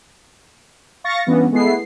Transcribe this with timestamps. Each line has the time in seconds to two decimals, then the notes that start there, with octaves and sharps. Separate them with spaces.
1.04 F5 C#6 A6 A#6 C#7
1.26 G2 E3 B3 C#4
1.52 G#3 A3 B3 E4 C7